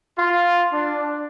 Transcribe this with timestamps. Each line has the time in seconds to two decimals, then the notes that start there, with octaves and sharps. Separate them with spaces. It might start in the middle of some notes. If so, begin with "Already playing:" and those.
0.17 F4
0.72 D4